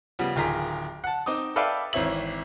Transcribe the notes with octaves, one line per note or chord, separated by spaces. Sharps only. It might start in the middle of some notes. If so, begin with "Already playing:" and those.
C#3 F3 G3 B3
D1 D#3 F4 G#4 A#5 B6
F#5 A5
C4 D#4 D6 D#6
A4 B4 D5 E5 F5 G5
G#1 E3 C4 C#5 E5 F#7